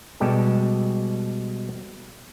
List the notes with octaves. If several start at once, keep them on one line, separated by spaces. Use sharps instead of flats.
B2 G3 G#3 G4 A4